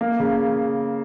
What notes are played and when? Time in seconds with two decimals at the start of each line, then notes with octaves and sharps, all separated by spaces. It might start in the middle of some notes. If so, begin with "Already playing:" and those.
0.01 A#3
0.19 C#3